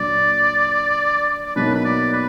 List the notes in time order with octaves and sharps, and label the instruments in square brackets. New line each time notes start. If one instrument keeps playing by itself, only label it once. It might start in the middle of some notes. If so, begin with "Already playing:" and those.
Already playing: [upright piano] A#2 F#3 D4 [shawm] D5
[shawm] D5
[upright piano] B2 F#3 A#3 D#4 [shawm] B4
[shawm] B4
D5
B4